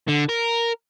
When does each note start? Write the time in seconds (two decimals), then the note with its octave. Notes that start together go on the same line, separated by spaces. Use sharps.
0.09 D3
0.29 A#4